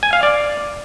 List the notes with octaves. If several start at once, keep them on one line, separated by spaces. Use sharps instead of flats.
G#5
F5
D5